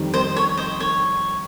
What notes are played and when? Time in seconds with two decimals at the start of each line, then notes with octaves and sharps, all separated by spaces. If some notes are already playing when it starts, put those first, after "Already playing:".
Already playing: F2 D#3 G3
0.14 C5 D#5
0.36 C#5
0.57 C5 D#5
0.80 C#5